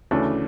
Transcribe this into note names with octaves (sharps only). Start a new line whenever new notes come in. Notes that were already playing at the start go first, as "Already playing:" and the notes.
D2 C#3 E3 A3 D4